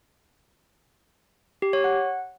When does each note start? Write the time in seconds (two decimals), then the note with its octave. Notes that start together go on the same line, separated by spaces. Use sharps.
1.62 G4
1.73 C#5
1.84 F#5